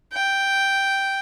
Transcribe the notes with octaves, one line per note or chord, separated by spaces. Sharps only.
G5